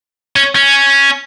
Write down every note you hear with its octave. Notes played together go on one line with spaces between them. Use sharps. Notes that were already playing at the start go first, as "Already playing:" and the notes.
C#4
C#4